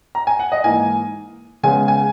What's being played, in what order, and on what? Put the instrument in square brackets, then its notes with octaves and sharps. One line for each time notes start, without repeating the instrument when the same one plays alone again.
[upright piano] A#5
G#5
F#5
D#5
G#2 E3 A#3 G#5
C#3 G#3 B3 G#5
G#5